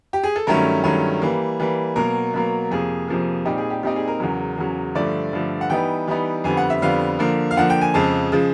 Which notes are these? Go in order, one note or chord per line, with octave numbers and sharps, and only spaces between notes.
G4
G#4
A4
G2 D#3 F#3 A3 C#4 A#4
G2 D#3 F#3 A3 C#4
E3 G3 A#3
E3 G3 A#3
B2 F#3 A#3 A#4
B2 F#3 A#3
F2 C3 F3 A#3 G#4
F2 C3 F3 A#3
A#2 G3 C4 D#4 G4
G#4
G4
A#2 G3 C4 D#4 G4
G#4
A#4
E2 C#3 F#3
E2 C#3 F#3
G2 D3 F3 A3 D5
G2 D3 F3 A3
F#5
E3 G3 B3 D#4 G5
E3 G3 B3 D#4
F2 D3 G3 B3 G#5
F#5
E5
F2 D3 G3 B3 F5
D3 F3 A#3
F5
D3 F3 A#3 F#5
G5
G#5
F2 C#3 F3 G#3 A5
C#3 F3 G#3